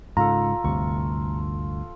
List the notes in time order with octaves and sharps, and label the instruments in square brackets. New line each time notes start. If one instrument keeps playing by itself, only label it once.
[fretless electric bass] G#2 C#3 [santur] F4 A4 [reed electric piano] A#5
[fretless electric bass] D2 G2 C3 [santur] C#6